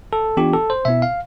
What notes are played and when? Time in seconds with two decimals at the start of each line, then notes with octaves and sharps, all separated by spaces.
0.13 A4
0.37 E3 B3 D4 F4 G4
0.54 A4
0.70 C5
0.85 B2 B3 E4 E5
1.02 F5